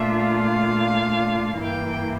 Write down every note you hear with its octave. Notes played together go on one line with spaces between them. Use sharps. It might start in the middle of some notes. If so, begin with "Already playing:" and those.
Already playing: A#2 A3 D4 F4 E5
F5
G2 E3 A#3 E4 G5